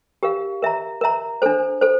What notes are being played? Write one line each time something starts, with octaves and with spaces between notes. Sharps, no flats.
G4 A#4 F5
A#4 E5 A#5
A#4 E5 A#5
D4 A4 C5
A4 C5